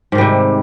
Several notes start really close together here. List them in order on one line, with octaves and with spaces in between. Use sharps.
G#2 D#3 G3 C3